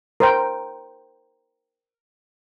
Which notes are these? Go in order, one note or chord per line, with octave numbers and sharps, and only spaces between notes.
A#4 C5 G5